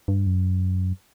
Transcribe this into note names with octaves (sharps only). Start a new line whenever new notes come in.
G2
F#2